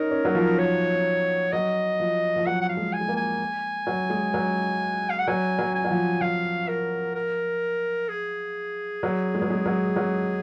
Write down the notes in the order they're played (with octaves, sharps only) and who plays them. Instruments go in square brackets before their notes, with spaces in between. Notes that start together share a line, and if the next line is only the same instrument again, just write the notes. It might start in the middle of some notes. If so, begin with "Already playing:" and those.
Already playing: [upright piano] C#4 D#4 [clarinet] A#4
[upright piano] C#4
F#3
F3
[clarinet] C#5
[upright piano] F#3 [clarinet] D#5
[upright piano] F3
F3
[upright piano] F#3 [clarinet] F#5
[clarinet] F#5
F5
[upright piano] G#3
[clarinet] G#5
[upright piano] G#3
A#3
[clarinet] G#5
[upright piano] F#3
G#3
F#3
[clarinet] F5
F#5
[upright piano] F#3 [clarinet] G#5
[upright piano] F#3
[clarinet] G#5
[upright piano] F#3
F3
[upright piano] F3 [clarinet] F5
[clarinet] A#4
A#4
G#4
[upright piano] F#3
G#3
F#3
G#3
F#3
F#3